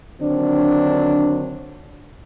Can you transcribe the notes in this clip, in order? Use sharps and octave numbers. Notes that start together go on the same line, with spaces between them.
D3 D#3 F#3 C4 D4